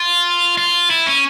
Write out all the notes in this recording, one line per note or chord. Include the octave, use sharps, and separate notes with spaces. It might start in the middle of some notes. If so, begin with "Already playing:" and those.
Already playing: F4
F4
E4
C#4